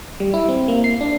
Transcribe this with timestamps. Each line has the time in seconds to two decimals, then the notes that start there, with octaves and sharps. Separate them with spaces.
0.20 G3
0.34 E4
0.49 C4
0.68 A#3
0.84 C7
1.01 D4